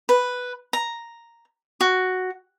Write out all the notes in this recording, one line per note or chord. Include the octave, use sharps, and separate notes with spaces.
B4
A#5
F#4